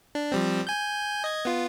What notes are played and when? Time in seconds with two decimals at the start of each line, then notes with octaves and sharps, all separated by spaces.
0.15 D4
0.32 F3 G3 C4
0.67 G#5 G6
1.24 D#5 G#6
1.45 B3 F4